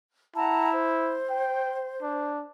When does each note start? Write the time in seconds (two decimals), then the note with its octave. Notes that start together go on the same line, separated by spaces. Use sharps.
0.36 E4 F#5 A5 A#5
0.72 C5
1.30 G5
2.02 D4